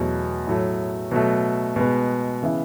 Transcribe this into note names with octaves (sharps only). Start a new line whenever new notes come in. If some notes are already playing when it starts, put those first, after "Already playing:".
Already playing: E2 B2 F#3 A3
A2 F#3 A3
B2 F#3 A3
B2 G#3 B3
C#3 E3 B3 E4